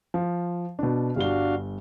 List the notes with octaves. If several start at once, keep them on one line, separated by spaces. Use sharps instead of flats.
F3
B2 D4
G1 G3 D4 F#4 F5 G7